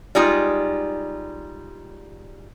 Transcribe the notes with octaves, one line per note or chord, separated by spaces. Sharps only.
G3 G#3 D#4 F4